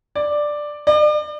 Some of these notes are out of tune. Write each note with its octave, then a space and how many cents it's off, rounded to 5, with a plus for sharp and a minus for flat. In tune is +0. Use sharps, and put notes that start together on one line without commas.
D5 +5
D5 +40